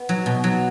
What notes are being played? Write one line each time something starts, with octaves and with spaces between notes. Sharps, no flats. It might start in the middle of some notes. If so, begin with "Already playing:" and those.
Already playing: B3
F#3
B2
F#3